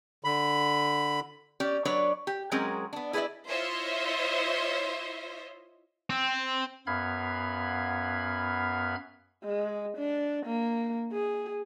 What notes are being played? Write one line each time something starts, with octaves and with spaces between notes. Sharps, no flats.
D3 B5
C#4 G4 D5
F#3 D4 B4 C#5 D5
G4
F#3 G#3 C4 C#4 G#4 A#4
B3 D4
E4 G#4 B4 C5 D5 E5
E4 F4 C5 C#5 D#5 E5
C4
F#2 B3 F5 B5 F6 G#6
G#3
D4
A#3
G#4